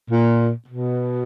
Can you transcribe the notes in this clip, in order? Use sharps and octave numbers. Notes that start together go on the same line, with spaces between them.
A#2
B2